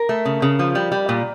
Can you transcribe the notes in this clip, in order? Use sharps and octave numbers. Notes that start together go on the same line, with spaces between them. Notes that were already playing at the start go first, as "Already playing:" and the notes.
Already playing: A#4
A3
C#3
C#3
F3
G3
G3
A#2